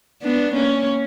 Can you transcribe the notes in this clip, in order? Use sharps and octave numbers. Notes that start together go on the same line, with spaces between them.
B3 D4
A#3 C#4